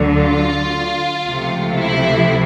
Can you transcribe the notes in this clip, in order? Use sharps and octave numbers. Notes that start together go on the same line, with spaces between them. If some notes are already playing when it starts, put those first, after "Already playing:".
Already playing: D2 D3 F#3
F4
C#2 C3 F3 A3
E4